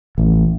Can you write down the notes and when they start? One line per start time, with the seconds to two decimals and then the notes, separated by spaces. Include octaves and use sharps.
0.18 A1